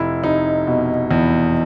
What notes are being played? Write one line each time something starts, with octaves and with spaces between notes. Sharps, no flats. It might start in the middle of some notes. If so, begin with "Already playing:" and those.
Already playing: F1 E4
F1 D#4
B2
E2